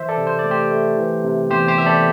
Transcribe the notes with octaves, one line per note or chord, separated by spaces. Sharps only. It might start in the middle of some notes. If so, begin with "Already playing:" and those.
Already playing: E3 C5 E5
A4 D5
C3
C5
D5
A3
G4 C5
A3
E3
C3
E2 G4 C5
G4 C5
E2 E5
A4 D5